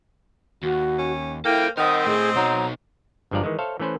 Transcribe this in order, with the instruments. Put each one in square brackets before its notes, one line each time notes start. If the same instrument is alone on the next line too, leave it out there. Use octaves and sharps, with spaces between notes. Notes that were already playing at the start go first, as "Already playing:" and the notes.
[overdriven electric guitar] D#2 [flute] F#4
[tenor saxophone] C#4
[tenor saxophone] A#3 [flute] E4 [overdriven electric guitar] A4 C5 [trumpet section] G5
[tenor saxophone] D#3 [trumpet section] C4 C5 D#5 [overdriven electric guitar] A#4 F#5 [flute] D#6
[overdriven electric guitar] A2 A3 [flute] G#4
[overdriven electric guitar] B2 D#4 [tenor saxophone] F#3 [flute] A#5
[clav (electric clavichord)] G1 G2 F3 G#3 D5 A#5
D#3 E3 G#3
A4 C5 C#5 E5 F5
E3 A3 C#4 B4 C5